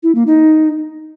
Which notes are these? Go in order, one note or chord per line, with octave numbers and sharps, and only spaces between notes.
E4
A#3
D#4